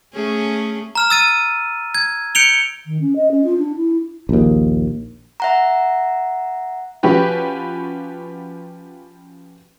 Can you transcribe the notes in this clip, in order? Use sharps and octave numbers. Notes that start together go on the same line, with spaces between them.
A3 C#4 G#4
A#5 F6 E7
E6 A6 D#7
G#6
G6 C#7 D7 F7 G7
D#3
C#4
D#5
C#4
F4
D4
E4
A#1 D#2
E5 F#5 A#5
F3 C#4 F#4 G4 B4